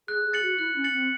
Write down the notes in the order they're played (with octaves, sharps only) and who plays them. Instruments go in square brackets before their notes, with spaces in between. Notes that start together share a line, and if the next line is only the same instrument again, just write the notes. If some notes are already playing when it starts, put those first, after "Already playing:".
[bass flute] G#4 [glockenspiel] F#6
[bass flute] G#4
[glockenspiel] A6 C#7 F#7
[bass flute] F#4
[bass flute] E4 [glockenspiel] F#6
[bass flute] C#4
[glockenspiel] A6 C#7 F#7
[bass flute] C4